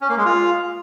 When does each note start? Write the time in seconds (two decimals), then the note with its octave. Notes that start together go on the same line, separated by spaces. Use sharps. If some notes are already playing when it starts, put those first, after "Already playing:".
0.01 C#4
0.09 A#3
0.17 G#3
0.25 F4